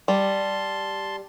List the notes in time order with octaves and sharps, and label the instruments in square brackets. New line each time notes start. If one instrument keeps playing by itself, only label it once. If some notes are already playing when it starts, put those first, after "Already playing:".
[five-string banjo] G3 [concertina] A5 C6